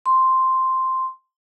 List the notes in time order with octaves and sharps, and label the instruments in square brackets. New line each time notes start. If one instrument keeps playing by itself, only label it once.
[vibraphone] C6